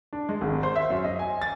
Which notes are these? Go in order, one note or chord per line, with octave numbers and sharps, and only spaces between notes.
D4
G#3
G#1
C5
E5
F#2
D#5
G#5
A6